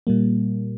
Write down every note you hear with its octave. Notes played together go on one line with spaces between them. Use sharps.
A#2 G3 A#3